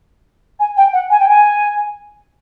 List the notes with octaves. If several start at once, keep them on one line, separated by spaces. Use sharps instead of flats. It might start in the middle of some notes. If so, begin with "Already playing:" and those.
G#5
G5
F#5
G#5
G5
G#5